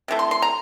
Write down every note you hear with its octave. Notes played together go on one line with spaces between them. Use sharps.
C3 E3 A3
C6
C6
A#5